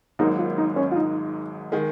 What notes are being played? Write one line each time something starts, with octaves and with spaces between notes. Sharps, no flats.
G#1 G#2 F#3 A#3 D#4
F4
D#4
C#4
F4
D#4
D#3 G#3